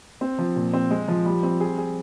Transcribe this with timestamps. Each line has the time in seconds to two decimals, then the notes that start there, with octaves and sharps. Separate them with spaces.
0.21 C4
0.38 F3
0.56 A#2
0.73 C4
0.91 G#3
1.08 F3
1.25 G3
1.43 C4
1.60 G#4
1.78 G#4